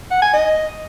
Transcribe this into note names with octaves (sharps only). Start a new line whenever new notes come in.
F#5
G#5
D#5